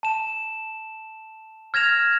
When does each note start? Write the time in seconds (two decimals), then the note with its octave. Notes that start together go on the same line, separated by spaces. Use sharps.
0.03 A5 E7
1.74 F6 G#6 A#6 E7 F7